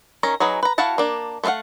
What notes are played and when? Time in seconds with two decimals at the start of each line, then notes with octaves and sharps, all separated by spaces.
0.23 D#3 C#4 A#5
0.40 F#3 D#4 G#4 B4
0.63 B4 A#5
0.78 E4 F#4 F5 F#5 A5
0.98 A#3 D4
1.44 A3 B3 B4 F5 F#5